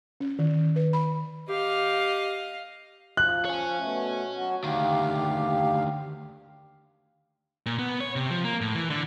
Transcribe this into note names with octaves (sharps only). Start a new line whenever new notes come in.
C#4
D#3
B4
B5
G4 D#5 F5
F3 F#6
C#5 G#5
B2 A3
F#3 F#4
D2 D#3 G4 F5
A#2
B3
C#5
C3
F3
A#3
A2
E3
D3